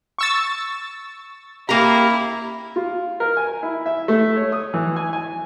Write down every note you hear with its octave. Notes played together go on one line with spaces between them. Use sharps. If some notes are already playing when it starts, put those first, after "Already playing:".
C#6 E6 A6
A#3 E4 G4 A#5
F4
A#4
G#5
E4
E5
A3
C#5
D#6
E3
G#5
G#5